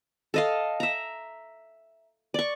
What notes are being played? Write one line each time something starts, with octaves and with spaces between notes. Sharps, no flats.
A4 D#5 F5
E5 A#5
D5 C#6